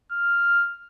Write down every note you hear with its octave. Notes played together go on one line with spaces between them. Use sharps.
F6